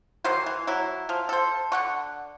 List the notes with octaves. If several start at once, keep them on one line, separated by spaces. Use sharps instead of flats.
D#3 E3 F#3 C5
E3
F#3 E4
F3
A4 C5
D3 F#5 C#6